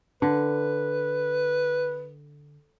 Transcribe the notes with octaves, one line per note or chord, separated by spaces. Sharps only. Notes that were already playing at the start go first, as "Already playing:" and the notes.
D3 B4